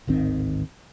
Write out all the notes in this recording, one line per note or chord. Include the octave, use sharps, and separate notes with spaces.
D1 G#1 D#3 C4